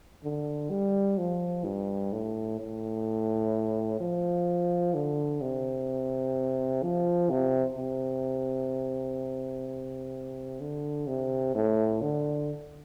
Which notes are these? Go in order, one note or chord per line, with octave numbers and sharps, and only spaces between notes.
D3
G3
F3
G2
A2
A2
F3
D3
C3
F3
C3
C3
D3
C3
A2
D3